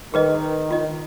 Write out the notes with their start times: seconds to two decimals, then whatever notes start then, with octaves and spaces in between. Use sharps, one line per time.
0.14 D#3 G#4 B4 D#5
0.71 F4 D#5